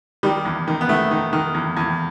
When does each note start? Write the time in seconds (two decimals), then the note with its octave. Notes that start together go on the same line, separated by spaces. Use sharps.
0.23 D#3 G3
0.45 E2
0.68 D#3
0.81 B3
0.89 D#3 A3
1.11 D#3
1.33 D#3
1.55 E2
1.77 E2